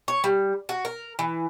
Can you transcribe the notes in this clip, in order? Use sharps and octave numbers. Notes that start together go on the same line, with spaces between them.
C#5
G3
F#4
A#4
E3